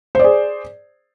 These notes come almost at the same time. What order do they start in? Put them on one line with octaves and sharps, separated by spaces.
C5 D5 G#4